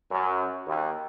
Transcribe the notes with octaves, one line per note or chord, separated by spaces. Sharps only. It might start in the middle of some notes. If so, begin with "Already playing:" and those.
F#2
D#2